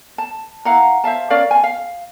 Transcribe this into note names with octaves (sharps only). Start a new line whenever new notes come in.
A5
E4 F5 F#5 A#5
C5 E5 F5 A5
C#4 A#4 D5 F5
G#5
F5